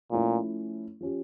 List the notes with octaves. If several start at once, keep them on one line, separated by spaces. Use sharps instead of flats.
A#2 F3 A3 C#4 E4
F3 C#4 G4